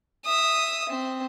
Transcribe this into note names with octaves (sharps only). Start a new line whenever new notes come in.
E5 D#6
C4